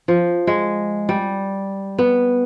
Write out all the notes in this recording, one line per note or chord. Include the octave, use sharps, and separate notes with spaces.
F3
G#3
G3
B3